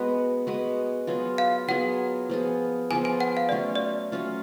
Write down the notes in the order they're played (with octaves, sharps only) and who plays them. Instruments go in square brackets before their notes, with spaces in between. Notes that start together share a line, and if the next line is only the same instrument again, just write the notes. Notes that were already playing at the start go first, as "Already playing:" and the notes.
Already playing: [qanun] G#3 B3 F#4 B4
G#3 B3 F#4 B4
F#3 B3 F4 G#4
[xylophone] F5
[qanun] F#3 B3 F4 G#4 [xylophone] F#5
[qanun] F3 B3 F4 G#4
[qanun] F3 B3 F4 G#4 [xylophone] G#5
[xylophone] G#5
F#5
F5
[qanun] F#3 A3 C#4 F4 [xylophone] D5
[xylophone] D5
[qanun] F#3 A3 C#4 F4